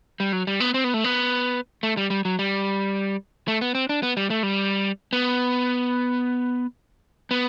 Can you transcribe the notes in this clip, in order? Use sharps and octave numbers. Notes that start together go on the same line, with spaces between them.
G3
F#3
G3
B3
C4
B3
A3
B3
A3
G3
G3
F#3
G3
A3
B3
C4
D4
B3
G3
A3
G3
B3
B3